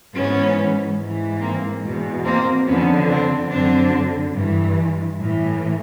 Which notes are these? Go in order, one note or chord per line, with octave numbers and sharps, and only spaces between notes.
G#2 E3 B3 C#4
G#2 E3
A#3 C4
E2 B2
A#3 C4
F2 D3 B3 C#4
C4 D4
F#2 D3 C4 D4
G2 E3
A2 E3